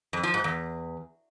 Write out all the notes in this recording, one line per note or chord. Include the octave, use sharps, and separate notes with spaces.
F2
F3
G#2
E2